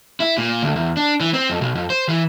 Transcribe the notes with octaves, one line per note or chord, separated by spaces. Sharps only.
E4
A#2
D2
E2
D4
E3
C4
F2
B1
F2
C5
E3